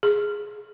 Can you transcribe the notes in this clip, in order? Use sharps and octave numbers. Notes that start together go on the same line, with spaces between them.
G#4